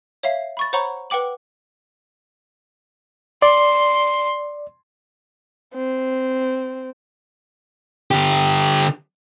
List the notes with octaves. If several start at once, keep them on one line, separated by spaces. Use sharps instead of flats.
C#5 E5 F5 C7
B5 C#6 A6
C5 C#5 F#5 A#5 B5 C#6
B4 F#5 G5 D6 F#7
D5 C6
C4
D3 G4